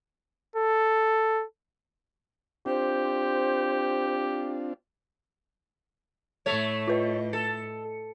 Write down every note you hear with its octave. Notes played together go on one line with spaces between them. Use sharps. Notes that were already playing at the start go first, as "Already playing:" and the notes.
A4
C4 D4 F4 G4 C5
A2 A3 C#5
F4 B4 D#5
A4 C#7